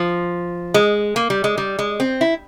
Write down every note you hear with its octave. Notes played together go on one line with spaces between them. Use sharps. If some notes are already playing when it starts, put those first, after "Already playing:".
Already playing: F3
G#3
A#3
G3
G#3
G3
G#3
C4
E4